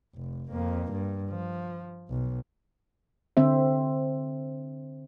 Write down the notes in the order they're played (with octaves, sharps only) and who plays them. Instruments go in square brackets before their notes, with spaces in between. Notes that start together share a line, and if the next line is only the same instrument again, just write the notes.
[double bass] F1
F2 A#3
G2
F3
B1
[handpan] D3 C4 C5 E5